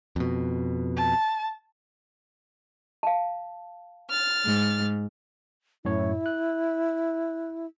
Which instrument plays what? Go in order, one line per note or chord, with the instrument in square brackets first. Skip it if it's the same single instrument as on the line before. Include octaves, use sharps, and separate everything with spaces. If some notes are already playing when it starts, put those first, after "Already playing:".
[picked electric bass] F2 B2
[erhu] A5
[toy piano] F5 A5
[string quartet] F6 A6
[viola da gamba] G#2
[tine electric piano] F#2 A2 C#5 [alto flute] E4
[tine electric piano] F#6